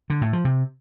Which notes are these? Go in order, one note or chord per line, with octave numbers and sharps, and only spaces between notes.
D3
A2
F3
C3